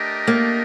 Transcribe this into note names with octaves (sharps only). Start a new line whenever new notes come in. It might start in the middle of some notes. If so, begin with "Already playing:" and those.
Already playing: A3 D4 G4 A#4 D#5
A#3